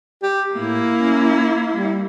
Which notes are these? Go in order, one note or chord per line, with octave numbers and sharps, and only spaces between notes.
G4
A2 A#3 E4
C#4
G3